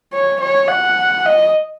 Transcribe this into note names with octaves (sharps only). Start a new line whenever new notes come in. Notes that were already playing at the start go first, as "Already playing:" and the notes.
C#5
C#5
F#5
D#5